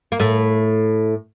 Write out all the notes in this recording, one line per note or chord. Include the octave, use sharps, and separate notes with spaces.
A#3
A2 A3